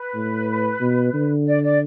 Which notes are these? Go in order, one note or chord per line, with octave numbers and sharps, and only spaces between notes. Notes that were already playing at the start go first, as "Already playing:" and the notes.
Already playing: B4
A2
B2
D3
D5
D5